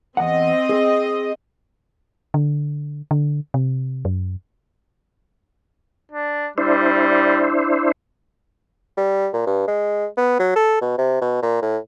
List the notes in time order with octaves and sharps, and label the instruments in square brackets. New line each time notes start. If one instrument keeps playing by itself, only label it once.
[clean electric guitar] E2 F#5 [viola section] C4 D#5
[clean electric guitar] G#4
[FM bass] D3
D3
C3
F#2
[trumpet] D4
[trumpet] G3 [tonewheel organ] D4 E4 C5
[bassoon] G3
A#2
G2
G#3
B3
F#3
A4
B2
C3
B2
A#2
A2